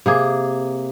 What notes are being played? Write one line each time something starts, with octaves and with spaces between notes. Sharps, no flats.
C3 A#3 G#4